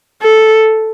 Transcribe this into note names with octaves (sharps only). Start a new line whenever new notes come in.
A4